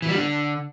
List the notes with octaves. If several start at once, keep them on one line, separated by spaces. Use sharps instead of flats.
E3
G3
D3